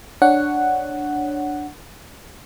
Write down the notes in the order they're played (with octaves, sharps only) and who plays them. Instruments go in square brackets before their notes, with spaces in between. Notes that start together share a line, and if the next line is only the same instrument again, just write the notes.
[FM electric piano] D4 C#5 F#5